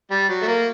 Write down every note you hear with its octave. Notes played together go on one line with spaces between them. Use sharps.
G3
F#3
A3
A#3